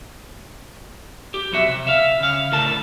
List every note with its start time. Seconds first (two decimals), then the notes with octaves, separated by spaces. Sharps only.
1.34 G4
1.51 B1 F2 F#4 E5
1.68 C3
1.87 E5 F5
2.20 C#3 F5
2.51 D2 A2 A#4 A5